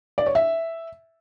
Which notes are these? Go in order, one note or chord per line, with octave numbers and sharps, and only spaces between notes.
D5
C#5
E5